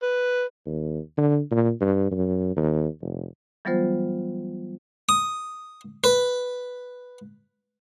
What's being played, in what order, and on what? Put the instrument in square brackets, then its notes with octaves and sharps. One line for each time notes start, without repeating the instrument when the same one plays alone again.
[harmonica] B4
[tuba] D#2
D3
A#2
G2
F#2
D#2
F1
[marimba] E3 F#3 G3 B3 F4 C5
[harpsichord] D#6
B4